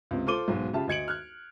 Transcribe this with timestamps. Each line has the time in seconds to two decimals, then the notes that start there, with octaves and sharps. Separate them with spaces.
0.11 C#2 C3
0.27 F4 A4 C5 D6 D#7 G7
0.48 B1 G#2 B2
0.73 C#3 F4 G4 E5 A5
0.88 D2 D#5 G#6 C#7 D7 F#7
1.08 F6 F#6 G#6